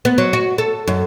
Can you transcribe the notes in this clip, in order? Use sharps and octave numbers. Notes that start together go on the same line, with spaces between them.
B3
F#3
F#4
A4
F#2